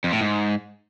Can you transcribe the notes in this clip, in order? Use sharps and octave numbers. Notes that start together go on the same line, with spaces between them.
F2
A2
G#2